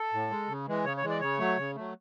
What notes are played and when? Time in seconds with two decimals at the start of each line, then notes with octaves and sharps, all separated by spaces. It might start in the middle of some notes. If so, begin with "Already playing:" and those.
Already playing: A4
0.13 A2
0.30 G#3
0.48 C#3
0.67 E3 G#3
0.85 C#3 C#5
0.97 C#5
1.03 E3 G#3
1.10 D5
1.21 C#3 C#5
1.39 F#3 A3
1.58 C#3
1.75 F#3 A3